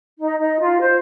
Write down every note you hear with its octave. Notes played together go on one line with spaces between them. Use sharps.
D#4
D#4
F4
C5